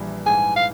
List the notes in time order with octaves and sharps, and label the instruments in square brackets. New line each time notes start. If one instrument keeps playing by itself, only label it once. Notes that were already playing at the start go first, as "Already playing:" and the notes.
Already playing: [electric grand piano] A#1 E3 G3
[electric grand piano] G#2 [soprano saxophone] G#5
[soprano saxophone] F5